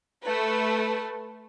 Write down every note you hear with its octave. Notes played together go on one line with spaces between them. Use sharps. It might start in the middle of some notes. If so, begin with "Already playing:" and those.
A3 B4